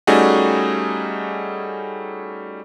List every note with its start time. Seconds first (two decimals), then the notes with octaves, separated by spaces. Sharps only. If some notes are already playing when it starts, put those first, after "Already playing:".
0.07 G3 A3 C#4 D#4 F#4 G#4